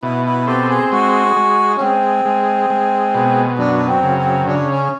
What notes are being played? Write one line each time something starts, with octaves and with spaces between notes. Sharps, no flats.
B2 E4
E4
C4 G4 A4
G#4
G#3 F#4
G#3
C#4
G#3 C4
G#3
G#3
B2
F#2 D4
C4
C#3
C4
C#3 D4
C#4